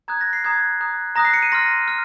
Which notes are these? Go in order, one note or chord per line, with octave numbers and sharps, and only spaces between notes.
A#5 D#6 F#6 G#6
A#6
C7
A#5 D#6 F#6 G#6
A#5 D#6 F#6
A#5 D#6 F#6 A#6
C7
C#7
D#7
C6 F6 A#6
F6